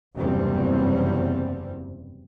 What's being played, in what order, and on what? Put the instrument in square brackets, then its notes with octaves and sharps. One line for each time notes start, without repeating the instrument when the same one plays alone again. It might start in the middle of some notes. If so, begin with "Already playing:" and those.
[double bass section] F#1 E2 G2 C3 G3 C4